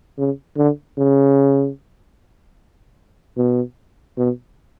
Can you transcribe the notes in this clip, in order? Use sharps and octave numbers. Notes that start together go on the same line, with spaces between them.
C#3
D3
C#3
B2
B2